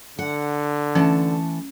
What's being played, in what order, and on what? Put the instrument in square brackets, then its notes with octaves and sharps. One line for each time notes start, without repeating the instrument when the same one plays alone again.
[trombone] D3 [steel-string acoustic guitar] F#5
[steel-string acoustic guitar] E3 A3 A5 [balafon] C#4